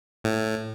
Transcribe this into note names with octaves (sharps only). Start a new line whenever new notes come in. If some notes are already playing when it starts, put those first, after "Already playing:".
A2